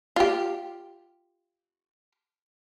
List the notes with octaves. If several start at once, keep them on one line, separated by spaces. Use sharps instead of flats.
F4 G4